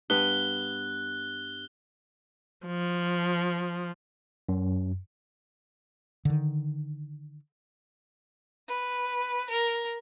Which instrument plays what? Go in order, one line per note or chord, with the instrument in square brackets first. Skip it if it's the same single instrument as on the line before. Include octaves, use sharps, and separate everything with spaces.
[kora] G2 B3 B4 [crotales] F#6 G7
[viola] F3
[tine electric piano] F#2
[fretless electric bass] D3 D#3
[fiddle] B4
A#4